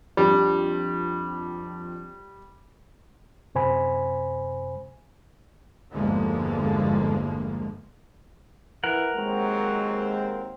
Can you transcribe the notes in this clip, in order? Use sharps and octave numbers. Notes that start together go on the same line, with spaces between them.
F2 G3 D4
F#2 C3 C5 G#5 B5
G1 E2 D3 F3 G#3 A#3
E3 A#4 F#5
D#2 F#3 G#3 C4